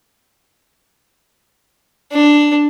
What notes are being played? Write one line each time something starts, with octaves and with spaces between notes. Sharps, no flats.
D4